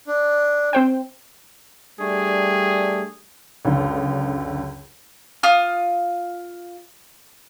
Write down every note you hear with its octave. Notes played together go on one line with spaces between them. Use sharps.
D4
C4 C5 G5
G3 A3 D4 G#4
C#2 F#2 D3
F4 D#6 F6